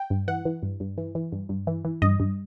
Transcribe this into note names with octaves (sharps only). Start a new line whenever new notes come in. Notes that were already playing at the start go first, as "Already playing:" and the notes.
Already playing: G5
G2
E3 F#5
E3
G2
G2
E3
E3
G2
G2
E3
E3
G2 D#5
G2